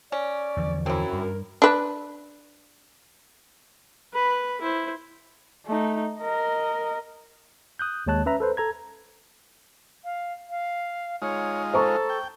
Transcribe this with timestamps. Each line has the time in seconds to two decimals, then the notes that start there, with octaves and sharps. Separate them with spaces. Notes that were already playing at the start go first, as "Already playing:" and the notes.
0.12 C#4 D5
0.57 E2 D3 F3
0.86 F#2 C4 E4
1.13 G2 A#4
1.62 D4 B4
4.14 B4 B5
4.61 E4 C5
5.66 A3 D#4
6.20 A#4 D#5
7.79 D#6 F#6 G6
8.07 D#2 G#3 C#5 A5 F#6
8.26 C#4 B4 E5 A#5
8.40 A4 B4 C5
8.57 A4 A#5 G#6
10.04 F5
10.50 F5
11.22 G#3 D#4 F4 C#5
11.74 A4 C5 A#5 C#6
12.09 G5